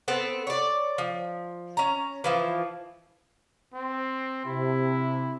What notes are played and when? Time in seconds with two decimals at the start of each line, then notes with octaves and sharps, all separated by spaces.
0.08 B3 C4 A4
0.47 C#5 D5
0.98 F3
1.77 C#4 A#5
2.24 E3 F3 E4
3.73 C4
4.46 C3 E4